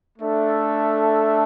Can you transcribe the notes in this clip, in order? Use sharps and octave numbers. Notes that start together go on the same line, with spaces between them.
A3 D4 A4 E5